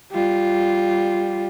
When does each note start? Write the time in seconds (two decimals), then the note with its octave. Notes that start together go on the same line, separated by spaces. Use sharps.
0.12 G3 F4